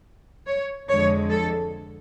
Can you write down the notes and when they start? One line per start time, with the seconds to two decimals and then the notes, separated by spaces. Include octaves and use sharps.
0.47 C#5
0.88 F2 D3 G#3 C#5
1.29 A4